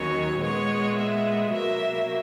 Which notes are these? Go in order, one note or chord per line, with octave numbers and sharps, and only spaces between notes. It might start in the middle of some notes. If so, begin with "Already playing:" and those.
Already playing: D#2 D#3 F#3 C#4 C#5
A#2 G#3 B3 C#5
E5
B2 F#3 A#3 E5